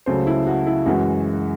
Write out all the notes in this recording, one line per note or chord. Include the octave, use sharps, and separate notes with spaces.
C#2 C#3 F#3 A3 C5
E4
F#4
E4
F#2 E3 G#3 F#4